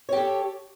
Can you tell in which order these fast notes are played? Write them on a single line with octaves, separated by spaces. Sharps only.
C#5 G4 A4